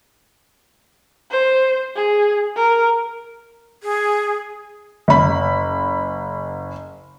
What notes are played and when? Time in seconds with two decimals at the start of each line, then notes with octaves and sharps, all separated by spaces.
1.30 C5
1.95 G#4
2.56 A#4
3.82 G#4
5.08 F#1 B5